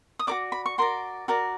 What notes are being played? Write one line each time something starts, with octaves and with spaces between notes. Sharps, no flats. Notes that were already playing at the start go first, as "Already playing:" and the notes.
D#6
F#4 A#4 D5 D6
B5
C#6
F#4 A#4 D5 C6
F#4 A#4 D5